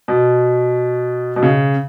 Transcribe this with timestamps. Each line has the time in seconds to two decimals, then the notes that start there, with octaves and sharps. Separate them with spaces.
0.08 B2
1.36 B2
1.43 C#3